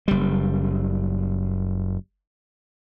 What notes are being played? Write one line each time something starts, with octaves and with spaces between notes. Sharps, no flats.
F#1 G3